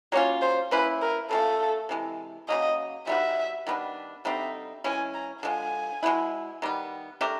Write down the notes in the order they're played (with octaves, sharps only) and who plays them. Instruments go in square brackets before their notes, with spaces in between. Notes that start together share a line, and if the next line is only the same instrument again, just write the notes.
[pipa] F#3 A#3 C#4 F4 [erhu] C#5
[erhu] C5
[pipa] A#3 C#4 E4 [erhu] B4
[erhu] A#4
[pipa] C#3 F3 A3 [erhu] A4
[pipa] C3 E3 G#3
[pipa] C#3 F#3 A#3 [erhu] D#5
[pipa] G3 B3 D#4 F#4 [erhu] E5
[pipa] D#3 G3 B3 D4
[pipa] D3 G3 C4 D#4 [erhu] E5
[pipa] E3 G#3 C#4 [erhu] G#5
[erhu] A#5
[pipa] D3 F3 G#3 [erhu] G#5
[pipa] B2 G#3 B3 E4
D#3 G3 B3
A3 D4 G4 A#4